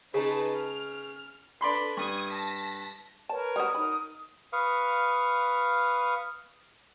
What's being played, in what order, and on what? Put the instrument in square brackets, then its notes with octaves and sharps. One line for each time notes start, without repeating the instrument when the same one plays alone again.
[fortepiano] C#3 [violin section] D#4 B4 A5
[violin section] F6
[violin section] D4 A4 B4 [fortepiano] D5 B5 C6
[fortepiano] G2 [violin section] D#6 G#6
[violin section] A5 A#6 B6
[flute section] A#4 B4 C#5 [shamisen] A5
[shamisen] G3 C#4 F#4 [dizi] D#6
[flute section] D#4 A#4 [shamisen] B5
[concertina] B4 F5 C#6 D#6 F6